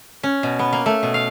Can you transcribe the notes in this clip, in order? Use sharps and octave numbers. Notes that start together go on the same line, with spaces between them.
C#4
B2
B3
A#3
A3
B2
F5